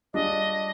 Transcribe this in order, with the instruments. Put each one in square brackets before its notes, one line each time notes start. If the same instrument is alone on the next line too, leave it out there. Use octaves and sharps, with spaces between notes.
[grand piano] G3 D4 F4 G#4 [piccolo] D#5